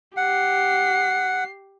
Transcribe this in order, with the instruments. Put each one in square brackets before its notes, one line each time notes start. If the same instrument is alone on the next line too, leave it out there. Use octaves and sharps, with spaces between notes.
[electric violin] G4 C7 [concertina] F#5